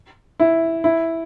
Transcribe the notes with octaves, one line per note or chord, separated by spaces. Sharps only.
E4
E4